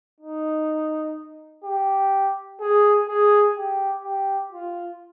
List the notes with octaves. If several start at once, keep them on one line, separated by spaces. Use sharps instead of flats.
D#4
G4
G#4
G#4
G4
G4
F4